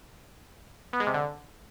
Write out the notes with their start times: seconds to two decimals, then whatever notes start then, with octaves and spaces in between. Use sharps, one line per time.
0.93 B3
1.00 G#3
1.07 C3
1.14 D3